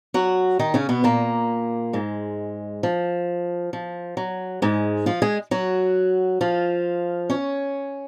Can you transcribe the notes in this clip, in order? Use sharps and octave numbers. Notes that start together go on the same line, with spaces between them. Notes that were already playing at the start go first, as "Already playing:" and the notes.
F#3 F#4
D#3 D#4
C#3 C#4
B2 B3
A#2 A#3
G#2 G#3
F3
F3
F#3
G#2 G#3
F3 F4
G#3 G#4
F#3 F#4
F3 F4
C#4 C#5